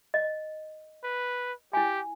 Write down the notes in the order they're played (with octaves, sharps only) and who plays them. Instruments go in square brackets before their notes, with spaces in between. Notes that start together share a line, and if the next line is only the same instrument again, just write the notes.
[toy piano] D#5
[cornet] B4
[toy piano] E4 G#5 [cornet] G4